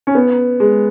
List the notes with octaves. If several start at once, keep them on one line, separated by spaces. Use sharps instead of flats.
C#4
B3
G#3